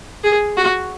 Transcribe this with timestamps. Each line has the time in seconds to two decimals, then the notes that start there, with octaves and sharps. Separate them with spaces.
0.24 G#4
0.57 F#4